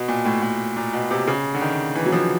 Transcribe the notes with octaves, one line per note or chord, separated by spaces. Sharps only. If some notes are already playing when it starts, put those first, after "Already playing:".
Already playing: B2
A#2
A2
A2
A#2
B2
C3
C#3
D3
D#3
E3
F#3
F3